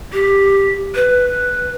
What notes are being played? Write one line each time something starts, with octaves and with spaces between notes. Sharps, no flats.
G4
B4